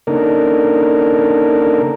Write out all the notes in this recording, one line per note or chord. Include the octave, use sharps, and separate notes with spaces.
C#3 A#3 D4 D#4 A4 A#4